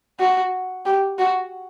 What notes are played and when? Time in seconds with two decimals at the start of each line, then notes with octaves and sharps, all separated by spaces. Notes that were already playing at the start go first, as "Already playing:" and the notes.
0.20 F#4
0.86 G4
1.18 F#4